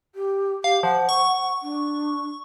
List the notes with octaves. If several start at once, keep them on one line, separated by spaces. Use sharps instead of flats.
G4
G4 F5
F3 F#5
C#6
D4